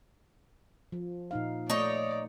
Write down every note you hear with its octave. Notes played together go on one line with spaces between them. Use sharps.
F3
A#2 D#4 F5
A3 D#4 C#5 D5